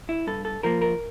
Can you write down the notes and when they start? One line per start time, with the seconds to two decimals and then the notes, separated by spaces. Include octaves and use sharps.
0.09 E4
0.27 G2 A4
0.45 A4
0.63 F3 A#3 A#4
0.82 A#4